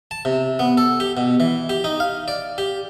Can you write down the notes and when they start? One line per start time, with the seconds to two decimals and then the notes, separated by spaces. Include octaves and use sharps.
0.11 A5
0.25 C3
0.59 B3
0.78 A4
1.00 G4
1.17 B2
1.40 E3
1.69 G4
1.84 D#4
2.00 F5
2.28 D5
2.58 G4